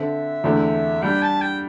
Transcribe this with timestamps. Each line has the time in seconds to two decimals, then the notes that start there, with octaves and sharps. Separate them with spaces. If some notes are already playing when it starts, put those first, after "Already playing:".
Already playing: D3 C4 A4 E5
0.44 E2 D3 A3 C4
1.02 G3 D4 G4 G5
1.22 A5
1.42 G5